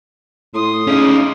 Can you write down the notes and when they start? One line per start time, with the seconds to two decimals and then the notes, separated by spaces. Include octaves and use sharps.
0.54 A2 C6 D#6
0.87 C#3 C#4 D#4